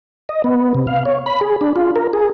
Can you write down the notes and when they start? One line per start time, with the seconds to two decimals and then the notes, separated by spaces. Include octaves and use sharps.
0.29 D#5
0.44 B3
0.75 C3
0.87 F5
1.05 C#5
1.26 B5
1.41 G#4
1.61 D4
1.76 F4
1.96 A#4
2.13 G#4